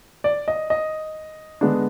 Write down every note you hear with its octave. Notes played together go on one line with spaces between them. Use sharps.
D5
D#5
D#5
D3 G#3 B3 D4